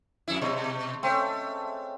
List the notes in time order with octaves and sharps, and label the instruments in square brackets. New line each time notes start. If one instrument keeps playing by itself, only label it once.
[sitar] F2 E4
[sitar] B2 [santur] G#3 C#5
[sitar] A3 [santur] C4 C#4